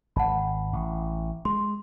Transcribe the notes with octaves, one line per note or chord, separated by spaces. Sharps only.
G#1 F#5 A5 B5
A1
G#3 C6